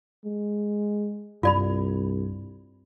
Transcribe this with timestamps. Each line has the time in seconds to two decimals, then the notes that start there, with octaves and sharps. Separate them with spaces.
0.25 G#3
1.43 C2 G2 F4 D5 B5